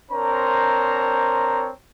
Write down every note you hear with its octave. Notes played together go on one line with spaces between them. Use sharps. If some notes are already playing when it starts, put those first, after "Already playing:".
C4 D4 A#4 C5 C#5 A#5